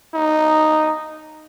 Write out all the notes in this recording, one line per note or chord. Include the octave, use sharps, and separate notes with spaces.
D#4